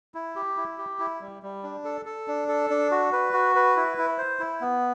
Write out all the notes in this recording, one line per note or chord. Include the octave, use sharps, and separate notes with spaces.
E4
G4
E4
G4
E4
G3
G3
D4
A4
A4
D4
A4
D4
F#4
B4
F#4
B4
E4
E4
C5
E4
B3